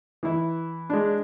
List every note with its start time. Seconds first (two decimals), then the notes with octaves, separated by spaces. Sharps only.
0.23 E3 E4
0.90 G#3 D4